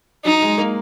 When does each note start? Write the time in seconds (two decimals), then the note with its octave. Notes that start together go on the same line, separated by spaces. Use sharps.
0.24 F#3 D#4
0.42 G#3
0.58 A#3